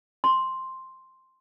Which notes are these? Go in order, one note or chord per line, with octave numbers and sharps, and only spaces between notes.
C6